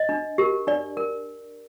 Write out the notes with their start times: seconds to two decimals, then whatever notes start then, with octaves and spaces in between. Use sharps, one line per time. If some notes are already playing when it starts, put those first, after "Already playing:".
Already playing: D#5
0.09 D4
0.38 G4 A#4
0.67 D4 D5
0.97 A#4